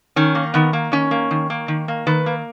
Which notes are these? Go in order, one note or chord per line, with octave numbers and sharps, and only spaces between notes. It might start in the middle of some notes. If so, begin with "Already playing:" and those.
D#3 C#4
A#3
D#3 B3
A#3
D#3 C#4
A#3
D#3
A#3
D#3
A#3
D#3 B4
A#3